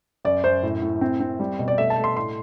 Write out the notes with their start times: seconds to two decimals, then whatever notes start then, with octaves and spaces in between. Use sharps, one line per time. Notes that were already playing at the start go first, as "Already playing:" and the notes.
0.25 F#2 D5
0.44 F#2 C5
0.63 A2
0.82 A2
1.01 C4
1.20 C4
1.39 G3
1.59 B2
1.68 D5
1.78 A3 E5
1.90 A5
1.97 A3
2.04 C6
2.17 A2 C6